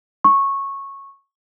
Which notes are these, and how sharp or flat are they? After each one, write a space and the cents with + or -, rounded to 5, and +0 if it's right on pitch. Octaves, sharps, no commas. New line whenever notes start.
C#6 -10